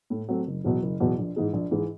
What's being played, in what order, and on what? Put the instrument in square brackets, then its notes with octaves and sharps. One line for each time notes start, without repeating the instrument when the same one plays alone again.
[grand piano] A2
F#3 A3 C4
F#1
E2 B2 F#3
F#1
E2 B2 F#3
A#1
G#2 E3 G#3
A#1
G#2 E3 G#3